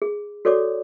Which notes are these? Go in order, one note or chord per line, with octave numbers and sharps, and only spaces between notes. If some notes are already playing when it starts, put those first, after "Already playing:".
G#4
F#4 A4 C#5 D5 D6